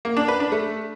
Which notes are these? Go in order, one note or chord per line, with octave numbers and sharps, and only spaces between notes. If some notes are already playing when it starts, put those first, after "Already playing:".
A#3
D4
B4
D4
A3